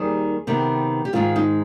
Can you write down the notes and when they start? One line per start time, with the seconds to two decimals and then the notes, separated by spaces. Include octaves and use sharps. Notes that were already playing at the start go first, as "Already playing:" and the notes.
Already playing: D#2 D#3 G3 G#4
0.47 C3 D#3 B3
1.05 G4
1.13 G#2 D#3 G#3 F4
1.36 D#4